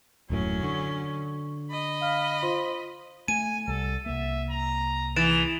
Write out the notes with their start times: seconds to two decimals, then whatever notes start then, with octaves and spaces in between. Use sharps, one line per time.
0.30 D#1 F#2 A2 F#3 C#4
0.63 D3 C#6
1.70 D#5 B5
2.01 F5 F6
2.42 F4 C5 C6
3.28 A3 G#5 D#7
3.68 C2 G3 A4
4.06 C2 A#3 E5
4.50 A#5
5.16 E3 G#4 A6 D7 E7